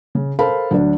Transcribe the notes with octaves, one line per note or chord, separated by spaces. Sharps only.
C#3
A4 A#4 C5 F5 A5 B5
D2 F#3 D4